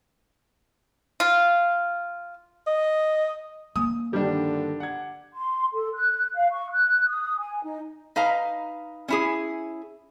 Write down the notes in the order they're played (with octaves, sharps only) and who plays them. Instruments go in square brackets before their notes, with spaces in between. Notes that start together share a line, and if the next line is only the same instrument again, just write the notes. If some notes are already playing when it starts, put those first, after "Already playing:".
[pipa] F4
[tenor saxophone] D#5
[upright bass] A#3 [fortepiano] D#6
[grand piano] G2 D#3 F3 [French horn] D3 [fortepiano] G3 D4
[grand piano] F#5 G#6
[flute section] C6
A4
F#6
F5
C#6
F#6
D#6
G#5
D#4
[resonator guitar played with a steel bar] D#4 B4 F5 A#5
C#4 E4 G#4